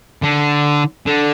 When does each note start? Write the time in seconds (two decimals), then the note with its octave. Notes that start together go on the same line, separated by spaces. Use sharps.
0.22 D3
1.07 D3